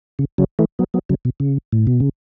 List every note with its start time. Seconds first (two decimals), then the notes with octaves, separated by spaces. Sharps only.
0.19 C#3
0.38 C#3 F#3
0.59 E3 A3
0.79 F#3 B3
0.94 F#3 B3
1.09 C#3 F#3
1.25 B2
1.40 C#3
1.73 A2
1.87 B2
2.00 C#3